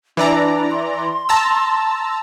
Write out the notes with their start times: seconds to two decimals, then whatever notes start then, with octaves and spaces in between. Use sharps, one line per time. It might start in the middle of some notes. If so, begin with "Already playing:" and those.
0.17 E3 D4 D5 A#5
0.71 C6
1.29 A5 A#5 E6